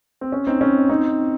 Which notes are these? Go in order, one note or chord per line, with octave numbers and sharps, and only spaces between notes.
C4
C#4
C4 D#4
C#4
C4 D#4